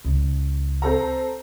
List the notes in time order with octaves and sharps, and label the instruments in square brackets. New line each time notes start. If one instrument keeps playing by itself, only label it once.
[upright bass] C#2
[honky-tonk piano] C4 A4 A#5